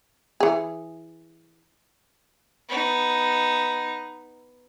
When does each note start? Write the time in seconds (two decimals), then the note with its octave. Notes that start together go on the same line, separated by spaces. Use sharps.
0.40 E3 G#4
2.69 B3 D#4